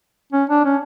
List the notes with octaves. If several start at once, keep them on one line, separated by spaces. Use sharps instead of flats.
C#4
D4
C#4